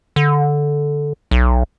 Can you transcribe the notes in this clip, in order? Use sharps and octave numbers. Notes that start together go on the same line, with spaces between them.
D3
B1